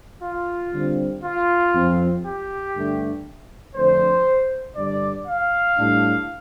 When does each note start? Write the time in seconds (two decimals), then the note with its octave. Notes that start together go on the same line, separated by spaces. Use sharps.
0.23 F4
0.74 D3 G3 C4
1.24 F4
1.75 F2 F3 C4
2.25 G4
2.76 G2 D3 A3 D4
3.76 F2 D3 A3 D4 C5
4.76 G2 D3 G3 D4 D5
5.27 F5
5.78 A2 G3 D4